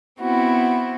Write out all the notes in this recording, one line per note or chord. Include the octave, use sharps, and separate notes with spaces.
B3 C4 E4 F#4